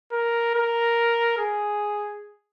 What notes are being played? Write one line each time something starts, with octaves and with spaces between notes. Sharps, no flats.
A#4
A#4
G#4